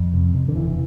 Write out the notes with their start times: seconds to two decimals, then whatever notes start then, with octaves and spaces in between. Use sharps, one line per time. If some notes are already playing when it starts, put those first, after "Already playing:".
Already playing: F2
0.14 C3
0.35 C3
0.48 D3
0.55 E1 E3